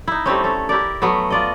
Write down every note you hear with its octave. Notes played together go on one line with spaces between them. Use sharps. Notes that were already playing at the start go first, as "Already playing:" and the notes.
D#4 E4
G3 A3 C4 C#4
C#4 A4
E4 G4 A#4 D5
F#3 A3 B3
F4 D5 D#5